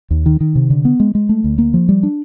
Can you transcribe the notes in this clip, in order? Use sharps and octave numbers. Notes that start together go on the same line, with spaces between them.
D#2
D#3
D#3
C3
D3
B3
G#3
G#3
A3
D2
A#3
F3
G3
D4